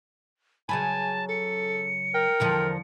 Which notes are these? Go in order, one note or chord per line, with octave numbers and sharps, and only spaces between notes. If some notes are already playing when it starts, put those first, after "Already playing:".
C#3 F#3 B4 G#5 A5
A4 C#7
A#4 G5
E2 D3 F3